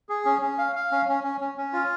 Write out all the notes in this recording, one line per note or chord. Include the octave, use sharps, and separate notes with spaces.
G#4
C#4
C#4
F5
F5
C#4
C#4
C#4
C#4
C#4
F4